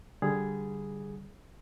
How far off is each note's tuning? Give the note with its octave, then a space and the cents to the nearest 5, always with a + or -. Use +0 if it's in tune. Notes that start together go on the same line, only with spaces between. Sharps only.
D3 +0 G3 +0 G#4 +0